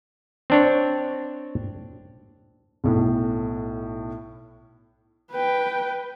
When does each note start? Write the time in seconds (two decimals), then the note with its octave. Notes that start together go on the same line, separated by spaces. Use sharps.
0.50 C4 D4 C#5
2.84 B1 A2
5.31 B4 G5